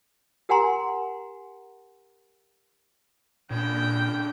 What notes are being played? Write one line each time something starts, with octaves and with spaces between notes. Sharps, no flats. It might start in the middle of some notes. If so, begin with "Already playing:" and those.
G4 A#4 F#5 G#5 A#5 C6
A#2 C#3 D4 G5